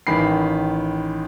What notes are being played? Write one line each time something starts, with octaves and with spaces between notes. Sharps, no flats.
A1 D#3 E3 B5 C7